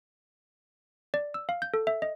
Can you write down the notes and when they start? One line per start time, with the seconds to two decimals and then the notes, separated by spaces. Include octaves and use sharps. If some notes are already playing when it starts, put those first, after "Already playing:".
1.14 D5
1.34 E6
1.49 F5
1.62 G6
1.74 A4
1.87 E5
2.02 D#5